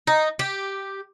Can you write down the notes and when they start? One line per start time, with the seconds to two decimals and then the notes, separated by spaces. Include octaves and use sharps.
0.07 D#4
0.39 G4